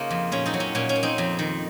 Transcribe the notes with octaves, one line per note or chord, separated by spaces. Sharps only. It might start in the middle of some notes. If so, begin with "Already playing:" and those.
Already playing: C#3 A#3 C#4 D#4 F4
F2
A#2 C#4
C4 D#4
F#3
C#4
A#2 C#4
C#4
A#2
C4 D#4
F2
D#3